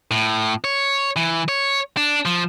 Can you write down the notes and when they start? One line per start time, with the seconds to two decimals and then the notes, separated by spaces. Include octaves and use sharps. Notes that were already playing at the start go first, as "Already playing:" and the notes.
0.11 A2
0.64 C#5
1.16 E3
1.48 C#5
1.97 D4
2.25 F3